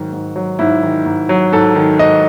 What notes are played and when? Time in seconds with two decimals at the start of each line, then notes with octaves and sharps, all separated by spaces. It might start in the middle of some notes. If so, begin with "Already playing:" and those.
Already playing: G#2 D#3 F#3
0.13 G#2
0.36 F#3
0.59 G#2 E4
0.83 D#3
1.06 G#2
1.29 F#3
1.52 G#2 A4
1.75 D#3
1.99 G#2 D#5